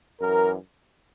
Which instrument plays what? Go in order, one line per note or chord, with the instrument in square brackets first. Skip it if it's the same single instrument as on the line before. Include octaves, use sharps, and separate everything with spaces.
[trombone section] F#2 E3 A#4